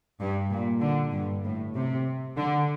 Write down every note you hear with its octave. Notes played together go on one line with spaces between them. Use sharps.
G2
A#2
D3
G2
A2
C3
D3